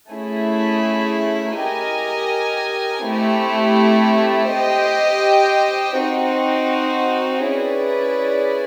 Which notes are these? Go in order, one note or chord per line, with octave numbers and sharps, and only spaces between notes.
A3 C#4 E4 G#4
G4 A#4 D#5 G#5
A3 C4 E4 G4
G4 C5 D#5 G5
C4 D#4 F#4
C#4 E4 G#4 B4 D5